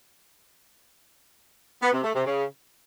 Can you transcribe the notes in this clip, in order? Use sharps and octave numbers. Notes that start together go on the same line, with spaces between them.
B3
C3
A3
C3
C#3